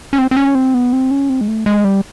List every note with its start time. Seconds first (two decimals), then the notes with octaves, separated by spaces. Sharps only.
0.13 C#4
0.19 C4
0.31 C4
0.37 C#4
0.55 C4
0.74 B3
0.93 C4
1.11 C#4
1.29 C4
1.41 G#3
1.48 A3
1.66 G#3
1.84 G3